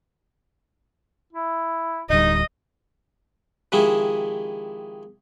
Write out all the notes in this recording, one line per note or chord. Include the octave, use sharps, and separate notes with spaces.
E4
D1 D2 G3 D#4 D#5
C3 D#3 F3 G#3 E4